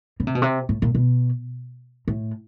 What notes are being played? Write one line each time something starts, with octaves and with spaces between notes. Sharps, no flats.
C#3
C3
B2
C3
A2
A#2
B2
A2